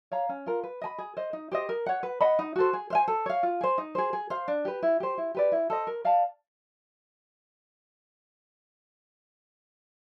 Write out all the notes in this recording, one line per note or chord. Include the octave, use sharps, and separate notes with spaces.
C#5 F5 A#5
C#4
F4 A#4
B4
D#5 G#5 B5
G#4
C5 D#5
D#4
G4 C5 D#5
A#4
C#5 F#5
B4
D#5 F#5 B5
D#4
F#4 A4 C5
G#4
C5 F5 G#5
A4
C#5 F5
F4
G#4 C5
D#4
G#4 C5
G#4
C5 F5
D4
G4 B4
E4
G4 C5
E4
G4 B4 D5
E4
A4 C5 D#5
A#4
D5 F5 A5